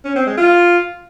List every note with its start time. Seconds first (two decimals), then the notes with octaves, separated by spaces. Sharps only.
0.05 C#4
0.16 C4
0.27 G#3
0.37 F4